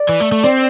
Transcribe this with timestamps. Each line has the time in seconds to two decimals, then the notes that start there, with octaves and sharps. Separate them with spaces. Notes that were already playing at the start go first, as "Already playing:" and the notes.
Already playing: D5
0.09 E3
0.20 A3
0.32 A3
0.43 C4 D5